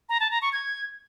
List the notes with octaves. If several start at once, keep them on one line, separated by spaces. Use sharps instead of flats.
A#5
A5
A#5
C#6
G#6